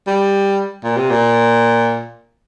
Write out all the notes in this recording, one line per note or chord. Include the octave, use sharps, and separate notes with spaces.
G3
A#2
C3
A#2